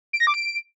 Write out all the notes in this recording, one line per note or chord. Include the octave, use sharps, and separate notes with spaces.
D7
A#6
D6
D7